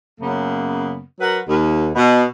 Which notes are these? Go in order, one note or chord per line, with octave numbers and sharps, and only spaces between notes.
F#2 C#3 A#3 B3
F#3 A#4 B4 F#5
D#2
B2